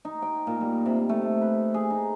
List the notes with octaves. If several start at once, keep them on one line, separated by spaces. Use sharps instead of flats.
D#4
G5
A#2
G3
C3
A3
B4
G#4
D#4